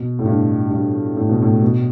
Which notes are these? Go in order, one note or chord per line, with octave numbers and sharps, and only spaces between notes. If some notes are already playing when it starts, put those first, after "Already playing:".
Already playing: B2
A2
G2
G2
A2
B2
A2
B2